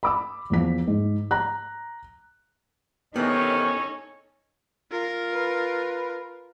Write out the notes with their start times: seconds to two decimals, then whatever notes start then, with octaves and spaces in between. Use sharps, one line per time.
0.03 B5 D6 E6
0.50 E2 F3 B6
0.87 G#2
1.31 A#5 F#6
3.16 C3 D#3 E3 B3 C#4 D#4 A4 C#5
4.91 F4 A#4
5.34 B4